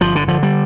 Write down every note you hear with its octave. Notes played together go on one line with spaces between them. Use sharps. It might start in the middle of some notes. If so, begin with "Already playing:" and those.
G1 F3
D3
D3 F3
G3